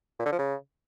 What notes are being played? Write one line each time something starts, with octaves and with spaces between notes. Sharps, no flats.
A#2
D3
F3
C#3